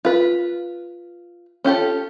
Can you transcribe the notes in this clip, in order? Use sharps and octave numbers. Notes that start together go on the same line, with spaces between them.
F4 B4
C#4 F4 G4 A4